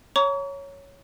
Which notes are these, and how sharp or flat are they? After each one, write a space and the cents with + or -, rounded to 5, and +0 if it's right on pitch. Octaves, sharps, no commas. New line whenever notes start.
C#5 +0 A#5 +0 C#6 +40